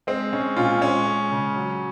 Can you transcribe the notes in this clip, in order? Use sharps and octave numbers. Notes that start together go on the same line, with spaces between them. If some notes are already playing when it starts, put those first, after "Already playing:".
G#3 C4
G#3 C#4
A#2 C#4 F4
G#3 C#4
G#3
C#3
F#3